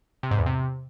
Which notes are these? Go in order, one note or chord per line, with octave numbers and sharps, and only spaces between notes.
C3
G#2
E2
C3